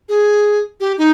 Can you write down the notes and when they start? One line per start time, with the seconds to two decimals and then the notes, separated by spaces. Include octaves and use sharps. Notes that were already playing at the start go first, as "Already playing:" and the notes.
0.09 G#4
0.80 G4
0.98 D#4